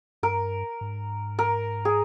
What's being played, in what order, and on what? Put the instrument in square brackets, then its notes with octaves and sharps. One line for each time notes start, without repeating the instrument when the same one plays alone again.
[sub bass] G2 [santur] A#4
[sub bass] G#2
[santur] A#4
G#4